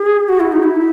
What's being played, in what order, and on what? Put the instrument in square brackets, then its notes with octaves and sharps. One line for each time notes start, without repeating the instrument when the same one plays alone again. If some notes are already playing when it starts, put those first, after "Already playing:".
Already playing: [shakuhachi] G#4
F#4
E4
D#4
E4